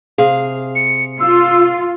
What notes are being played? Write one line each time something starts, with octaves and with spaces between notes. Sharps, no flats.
C3 G#4 F5
C#7
F4 E6